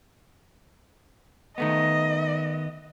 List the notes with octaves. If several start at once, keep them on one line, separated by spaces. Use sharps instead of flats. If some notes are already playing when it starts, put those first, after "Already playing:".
D#3 A3 B3 D#5